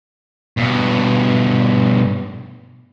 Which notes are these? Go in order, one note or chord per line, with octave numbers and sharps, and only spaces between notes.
G2 B2